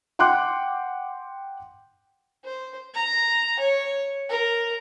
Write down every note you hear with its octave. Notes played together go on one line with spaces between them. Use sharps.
F#5 G5 C6 D6 F#6
C5
A#5
C#5
A#4